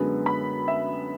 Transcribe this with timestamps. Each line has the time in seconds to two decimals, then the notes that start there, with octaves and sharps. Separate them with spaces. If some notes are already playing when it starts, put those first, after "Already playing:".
Already playing: F#2 D3 G#3 B3
0.26 B5
0.68 E5